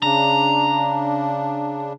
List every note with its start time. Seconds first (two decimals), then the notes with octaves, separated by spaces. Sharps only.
0.02 C#3 D4 A#5